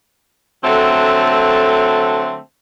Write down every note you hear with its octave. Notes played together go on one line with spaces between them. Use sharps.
D3 F#3 A3 C4 A4